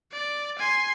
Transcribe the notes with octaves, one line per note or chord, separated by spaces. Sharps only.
D5
G#5 C6